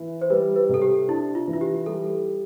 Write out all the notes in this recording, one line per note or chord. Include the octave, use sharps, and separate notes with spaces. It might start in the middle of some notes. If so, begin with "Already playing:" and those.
Already playing: E3
C5
G3 B4
B4
C3 A4
G4
D4 E4
F4
E3
F4
G4
G3 A4